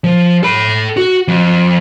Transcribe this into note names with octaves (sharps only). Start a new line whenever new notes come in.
F3
A4 B5
F#4
F2